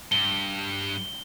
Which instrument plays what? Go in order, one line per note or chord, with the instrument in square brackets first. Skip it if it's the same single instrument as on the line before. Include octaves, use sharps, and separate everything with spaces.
[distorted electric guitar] G2 [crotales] G7